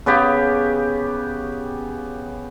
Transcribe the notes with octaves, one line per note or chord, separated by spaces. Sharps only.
C#3 B3 G4